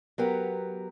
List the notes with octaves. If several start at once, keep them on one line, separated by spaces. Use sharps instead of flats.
F#3 B3 G4 A#4